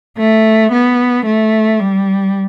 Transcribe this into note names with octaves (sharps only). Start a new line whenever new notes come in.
A3
B3
A3
G3